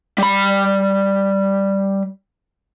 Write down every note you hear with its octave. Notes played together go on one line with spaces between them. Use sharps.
G3 B5